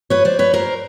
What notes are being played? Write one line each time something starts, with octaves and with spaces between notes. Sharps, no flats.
B4 C#5
C5 D5
B4 C#5
A#4 C5